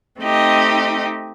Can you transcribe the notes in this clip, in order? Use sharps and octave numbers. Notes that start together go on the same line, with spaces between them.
A3 C4 D#4 G4 D#5